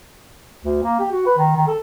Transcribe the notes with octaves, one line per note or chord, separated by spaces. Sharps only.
D2
A#3
G4
F#4
B4
D#3
D#3
A4